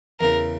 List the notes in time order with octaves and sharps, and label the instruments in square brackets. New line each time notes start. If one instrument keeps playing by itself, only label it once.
[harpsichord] E2 C#3 E3 [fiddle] A#4